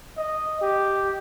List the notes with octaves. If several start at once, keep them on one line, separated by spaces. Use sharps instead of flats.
D#5
G4